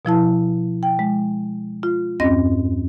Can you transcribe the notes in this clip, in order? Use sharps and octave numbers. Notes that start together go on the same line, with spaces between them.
B2 F3 E4 A5
G5
G#3
F4
E2 G2 C4 C#4 D#5 A#6